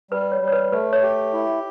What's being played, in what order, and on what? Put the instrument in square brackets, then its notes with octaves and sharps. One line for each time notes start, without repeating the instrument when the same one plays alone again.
[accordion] G3 [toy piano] B4
[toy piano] C#5
[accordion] G3
[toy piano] C#5
B4
[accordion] A3 [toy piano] B4
[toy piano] C#5
[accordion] G4
E4